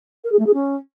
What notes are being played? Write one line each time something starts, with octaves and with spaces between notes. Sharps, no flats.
A#4
G#4
A3
G#4
C#4